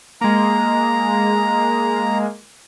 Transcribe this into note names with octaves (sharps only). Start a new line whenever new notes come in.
G#3 A#3 A#5